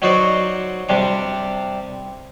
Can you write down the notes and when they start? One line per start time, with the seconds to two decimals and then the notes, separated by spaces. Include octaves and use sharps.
0.02 F#3 D#4 F#4 C5 D5
0.89 C3 G3 D4 D6